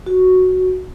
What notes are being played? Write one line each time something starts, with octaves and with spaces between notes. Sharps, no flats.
F#4